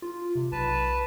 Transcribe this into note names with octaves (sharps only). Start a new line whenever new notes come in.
F4
C3
B1 B4 A5